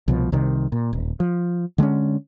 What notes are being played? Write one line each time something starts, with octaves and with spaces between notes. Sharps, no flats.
C2 B2 F3
C2 C3 D#3
A#2
D#1
F3
D3 G#3 C4 C#4